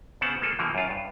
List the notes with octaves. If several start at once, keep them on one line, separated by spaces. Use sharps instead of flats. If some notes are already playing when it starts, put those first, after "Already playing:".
C#3 B3 C4 C5 F#5 A5
G#3 A#3 F4 A4 A#4
B2 D3 E3 F3 A#3
F#2 F4
G2